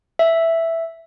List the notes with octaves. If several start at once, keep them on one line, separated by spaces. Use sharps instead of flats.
E5